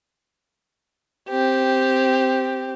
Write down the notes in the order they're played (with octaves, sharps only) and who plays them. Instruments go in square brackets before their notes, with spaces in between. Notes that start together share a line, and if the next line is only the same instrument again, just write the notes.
[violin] C4 G4